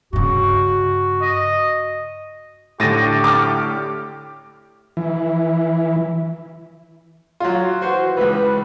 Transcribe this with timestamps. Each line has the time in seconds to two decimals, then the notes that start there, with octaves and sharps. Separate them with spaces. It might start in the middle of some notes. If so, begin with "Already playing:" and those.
0.13 G2 C#3 F#4
1.21 D#5
2.80 A2 D3 G4 A6 A#6 D#7
3.24 D6 F6
4.97 E3
7.40 F#3 F4
7.82 E3 F#4 C5
8.17 C#2 E3 B4